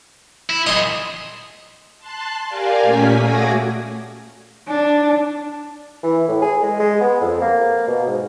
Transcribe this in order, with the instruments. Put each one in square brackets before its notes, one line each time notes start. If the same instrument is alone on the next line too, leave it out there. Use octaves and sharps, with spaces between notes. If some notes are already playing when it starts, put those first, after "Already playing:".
[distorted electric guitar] E4
[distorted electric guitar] A#2 G#4 [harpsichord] D#5 C6
[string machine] A5 C6 F#6
G4 A#4 D5 F5 G#5
A#2 A3 A#3 C#4 G#5 B6
A3 F#4 G#4 D6 G#6 A#6
[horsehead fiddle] D4
[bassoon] E3
A2
G#4
G#3
G#3
B3
F2
A#3
B2
G#2